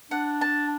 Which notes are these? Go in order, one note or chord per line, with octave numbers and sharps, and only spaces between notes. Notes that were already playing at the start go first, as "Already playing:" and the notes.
D4 F#5
A5